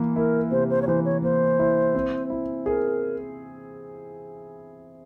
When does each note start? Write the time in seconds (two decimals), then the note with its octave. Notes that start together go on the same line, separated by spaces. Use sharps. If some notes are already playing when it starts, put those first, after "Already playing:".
Already playing: E3 A#3
0.16 E4 A#4
0.51 C3 C5
0.70 C5
0.82 C#5
0.87 E3 C5
1.05 C#5
1.23 A#3 C5
1.59 E4
1.95 C4
2.30 E4
2.66 G#4 A#4